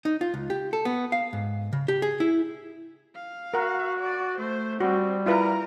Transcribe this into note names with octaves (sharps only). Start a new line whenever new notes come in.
D#4
F4
C#2
G4
A4
B3
F5
G#2
C#3
G4
G#4
E4
F5
F#4 A#4 F#5
D5
A3 C5
G3 C4 F#4
E4 F4 A#4 B4 A#5